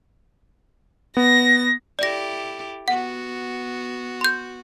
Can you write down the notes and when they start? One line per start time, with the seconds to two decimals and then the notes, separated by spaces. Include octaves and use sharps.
1.17 B3 A#6
1.99 E4 G4 A4 D5 A#6
2.88 B3 F#4 F#5
4.21 C6 G6